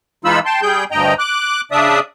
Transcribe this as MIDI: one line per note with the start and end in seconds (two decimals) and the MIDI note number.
0.25 0.39 52
0.25 0.39 56
0.25 0.39 63
0.25 0.39 65
0.25 0.39 83
0.25 0.39 88
0.45 0.61 79
0.45 0.61 81
0.45 0.61 84
0.62 0.84 55
0.62 0.84 68
0.62 0.84 79
0.62 0.84 91
0.91 1.14 38
0.91 1.14 43
0.91 1.14 75
0.91 1.14 79
0.91 1.14 82
1.19 1.61 86
1.19 1.61 90
1.72 2.00 49
1.72 2.00 62
1.72 2.00 74
1.72 2.00 76
1.72 2.00 87